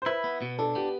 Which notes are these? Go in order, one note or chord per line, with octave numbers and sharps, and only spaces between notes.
C5
E4 B4
B3
B2
D4 A4
B3 G4